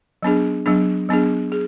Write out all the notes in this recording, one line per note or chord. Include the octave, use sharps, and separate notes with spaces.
F#3 B3 D4 G#4
F#3 B3 D4 G#4
F#3 B3 D4 G#4
G#4